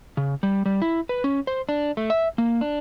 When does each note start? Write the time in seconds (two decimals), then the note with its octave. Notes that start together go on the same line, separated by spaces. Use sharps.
0.17 C#3
0.43 G3
0.66 G3
0.82 E4
1.09 B4
1.24 C#4
1.47 C5
1.69 D4
1.97 A3
2.10 E5
2.38 A#3
2.61 D4